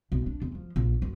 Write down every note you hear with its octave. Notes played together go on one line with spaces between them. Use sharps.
B1
D4
E2
F3
A#1
F#2